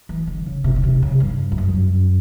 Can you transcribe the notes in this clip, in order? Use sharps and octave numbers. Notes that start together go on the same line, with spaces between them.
E3
D3
C#3
C3
C#3
C3
C#3
G2
F2
F#2